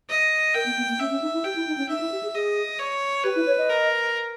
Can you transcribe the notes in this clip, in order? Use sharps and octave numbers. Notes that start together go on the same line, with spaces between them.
D#5
A#4 G5
B3
B3
A#3
C#4 E5
C#4
D#4
E4
G4 G5
E4
D#4
C#4
D#4 E5
E4
G4
G#4
G#4 D#5
C#5
G4 B4
E4
C#5
D#5
A#4